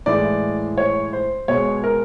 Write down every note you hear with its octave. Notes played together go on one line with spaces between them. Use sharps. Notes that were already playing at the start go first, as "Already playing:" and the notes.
A2 E3 G#3 D5
C#5
C5
B2 G#3 C#5
A#4